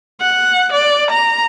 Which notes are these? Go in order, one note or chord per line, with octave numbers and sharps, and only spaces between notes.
F#5
D5
A#5